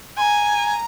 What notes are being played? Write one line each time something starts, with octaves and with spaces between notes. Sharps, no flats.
G#5 A#5 C6